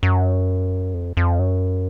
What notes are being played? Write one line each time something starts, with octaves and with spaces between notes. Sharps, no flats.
F#2
F2
F2
F#2